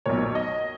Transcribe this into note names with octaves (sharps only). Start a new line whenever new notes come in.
B1 A#2 C#5
D#5